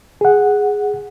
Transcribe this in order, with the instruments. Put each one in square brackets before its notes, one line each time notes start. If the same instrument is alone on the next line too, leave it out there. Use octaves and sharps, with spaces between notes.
[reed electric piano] G#4 F#5